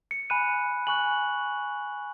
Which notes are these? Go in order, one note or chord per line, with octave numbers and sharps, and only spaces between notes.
C#7
G#5 B5 F#6 D#7
G#5 C#6 F#6 F#7